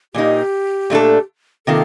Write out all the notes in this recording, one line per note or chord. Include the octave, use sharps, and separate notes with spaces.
A#2 G3 A#3 D#4 G4
A#2 A3 D4 A4
C3 D#3 A#3 F4 A4